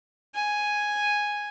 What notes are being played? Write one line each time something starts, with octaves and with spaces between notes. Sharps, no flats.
G#5